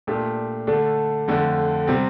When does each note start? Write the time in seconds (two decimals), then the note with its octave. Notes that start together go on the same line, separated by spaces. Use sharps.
0.07 A#2 A3 D4 G4
0.67 D3 A3 D4 A4
1.28 F2 D3 A3
1.87 C3 G3 C4